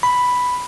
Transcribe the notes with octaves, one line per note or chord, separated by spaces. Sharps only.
B5